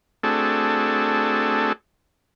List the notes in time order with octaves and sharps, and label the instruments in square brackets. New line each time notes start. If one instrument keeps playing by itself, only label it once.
[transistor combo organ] A3 C4 D4 F#4 G#4 A4